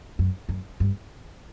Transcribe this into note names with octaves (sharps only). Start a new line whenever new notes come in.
F#2
F#2
G2